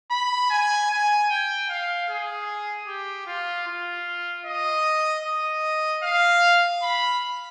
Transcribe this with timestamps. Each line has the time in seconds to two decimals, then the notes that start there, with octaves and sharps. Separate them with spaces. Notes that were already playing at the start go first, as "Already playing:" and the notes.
0.11 B5
0.50 G#5
0.90 G#5
1.30 G5
1.69 F5
2.09 G#4
2.87 G4
3.27 F4
3.67 F4
4.46 D#5
5.25 D#5
6.03 F5
6.83 B5